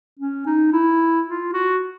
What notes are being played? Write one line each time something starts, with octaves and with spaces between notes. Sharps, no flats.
C#4
D#4
E4
F4
F#4